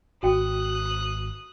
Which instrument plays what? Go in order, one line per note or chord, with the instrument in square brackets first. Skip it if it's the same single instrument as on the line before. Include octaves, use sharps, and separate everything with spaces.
[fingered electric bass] G#1 [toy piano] F#4 G5 [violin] D#6 F#6